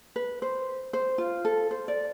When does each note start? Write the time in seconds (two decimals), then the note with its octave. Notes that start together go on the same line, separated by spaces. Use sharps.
0.16 B4
0.42 C5
0.93 C5
1.18 F4
1.45 A4
1.71 C5
1.88 D5